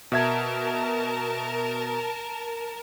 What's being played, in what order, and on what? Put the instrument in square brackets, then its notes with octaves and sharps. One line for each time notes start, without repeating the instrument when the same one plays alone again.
[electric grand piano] B2 E5 G#6 [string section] A#4 A5